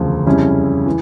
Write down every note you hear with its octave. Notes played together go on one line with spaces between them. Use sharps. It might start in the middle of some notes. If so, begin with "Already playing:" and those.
Already playing: E1 D2 C#3 F3
F2 C#3 G3 C#4 E4
E3